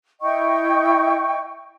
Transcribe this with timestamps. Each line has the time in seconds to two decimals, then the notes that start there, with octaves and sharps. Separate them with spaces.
0.21 E4 D#5 G5 C#6